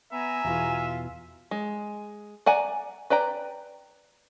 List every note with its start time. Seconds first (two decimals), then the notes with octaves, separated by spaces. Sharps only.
0.12 B3 E5 G#5 A#5
0.45 E2 B2 E3 F4
1.51 G#3
2.46 D5 F#5 G#5 A#5
3.10 B4 D5 G5 A#5